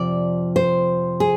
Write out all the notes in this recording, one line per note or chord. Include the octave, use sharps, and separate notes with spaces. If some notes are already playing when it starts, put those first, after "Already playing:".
Already playing: F2 C3 F3 D5
C5
G#4